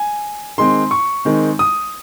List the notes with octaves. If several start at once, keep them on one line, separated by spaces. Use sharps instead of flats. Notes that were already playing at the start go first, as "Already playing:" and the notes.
Already playing: G#5
D#3 G#3 C4 C6
C#6
D#3 G#3 C4
D#6